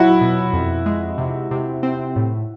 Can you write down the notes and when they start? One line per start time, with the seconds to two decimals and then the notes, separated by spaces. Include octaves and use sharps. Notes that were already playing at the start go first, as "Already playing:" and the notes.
Already playing: F#3 E4 F#4
0.21 B2
0.53 F2
0.86 G#3
1.18 C3
1.51 C3
1.83 C4
2.16 A2